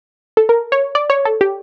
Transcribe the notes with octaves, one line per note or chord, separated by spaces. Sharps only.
A4
A#4
C#5
D5
C#5
A4
G4